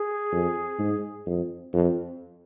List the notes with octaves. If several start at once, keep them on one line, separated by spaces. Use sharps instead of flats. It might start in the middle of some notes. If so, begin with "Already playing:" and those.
Already playing: G#4
F2
G#2
F2
F2